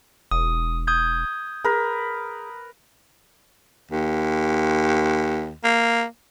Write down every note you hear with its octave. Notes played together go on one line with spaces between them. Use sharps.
E1 D#6
D#6 G6 G#6
G#4 A#4 B4
D#2
A#3